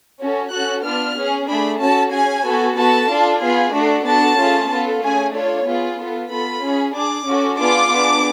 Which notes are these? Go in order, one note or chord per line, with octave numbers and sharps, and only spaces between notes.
C#4 F#4 A4
C#4 F#4 A4 F#6
B3 D4 F4 F6
C#4 G#4
A3 D4 G#4 B5
C#4 F#4 A4 A5
C#4 G#4 G#5
B3 F#4 A4
B3 F#4 A4 A5
D4 F4 A4
B3 F4 G#4
A3 D4 F#4 A4
B3 D4 F#4 A4 A5
A3 C#4 F4 G#4
B3 F4 A4
A3 C#4 G#4 G#5
D4 F4 A4 C#5
B3 F4 G#4
B3 F4 A4
B3 F4 A4 B5
C#4 G#4
D4 G#4 D6
C#4 F#4 A4
B3 D4 F4 G#4 D6
B3 D4 G#4